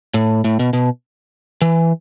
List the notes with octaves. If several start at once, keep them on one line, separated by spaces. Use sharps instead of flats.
A2
A2
B2
B2
E3